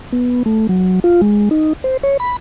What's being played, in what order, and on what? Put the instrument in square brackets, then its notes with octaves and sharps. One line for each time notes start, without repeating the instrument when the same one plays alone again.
[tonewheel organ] B3
A3
F#3
F4
G#3
D#4
C5
C#5
B5